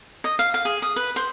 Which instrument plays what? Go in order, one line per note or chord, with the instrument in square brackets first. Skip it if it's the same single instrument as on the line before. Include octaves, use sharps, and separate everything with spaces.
[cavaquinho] D#5
F5
F5
G#4
D#6
B4
C5